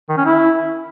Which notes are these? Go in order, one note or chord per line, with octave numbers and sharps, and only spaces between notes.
D#3
C#4
E4